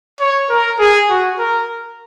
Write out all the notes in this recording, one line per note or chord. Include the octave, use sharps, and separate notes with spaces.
C#5
A#4
G#4
F#4
A#4